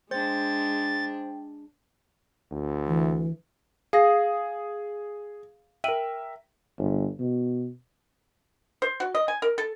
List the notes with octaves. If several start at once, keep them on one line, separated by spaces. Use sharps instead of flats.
G#3 D4 C5 G5 A6
D2
E3
G#4 F5 D#6 A#6
A#4 E5 G5 D#7 F#7
G1
B2
C5
F#4
D#5
G#5
A#4
A4